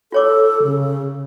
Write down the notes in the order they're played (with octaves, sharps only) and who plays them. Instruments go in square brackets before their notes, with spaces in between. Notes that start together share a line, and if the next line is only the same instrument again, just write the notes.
[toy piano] F4 C#5 D6 [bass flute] A4
[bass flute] C#3